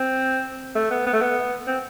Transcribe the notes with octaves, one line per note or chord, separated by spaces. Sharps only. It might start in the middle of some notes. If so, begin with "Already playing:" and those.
Already playing: C4
A3
B3
B3
A3
B3
C4